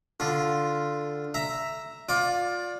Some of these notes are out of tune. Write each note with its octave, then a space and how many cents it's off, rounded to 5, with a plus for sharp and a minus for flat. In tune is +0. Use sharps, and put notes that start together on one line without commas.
D3 +0 F4 +0
E5 +0 A#5 +0
F4 +25 D5 +0